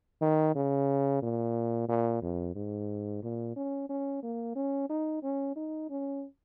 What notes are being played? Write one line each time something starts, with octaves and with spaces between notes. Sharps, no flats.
D#3
C#3
A#2
A#2
F2
G#2
A#2
C#4
C#4
A#3
C#4
D#4
C#4
D#4
C#4